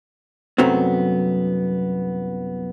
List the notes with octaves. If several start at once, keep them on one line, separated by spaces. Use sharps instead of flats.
C2 F#2 F#3 A3 B3 C4